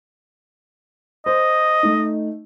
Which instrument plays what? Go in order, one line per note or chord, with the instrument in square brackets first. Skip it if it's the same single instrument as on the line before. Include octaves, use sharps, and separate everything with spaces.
[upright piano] C5 [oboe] D#5
[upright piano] A3 D#4